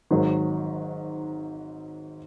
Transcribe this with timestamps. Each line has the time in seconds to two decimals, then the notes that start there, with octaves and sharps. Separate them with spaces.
0.11 G#1 G#2 D#3 F#3